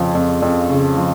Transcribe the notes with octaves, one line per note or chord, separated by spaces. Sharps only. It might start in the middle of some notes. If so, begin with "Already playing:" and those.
Already playing: F2 C#3 F3
F2
F2
C#3
F3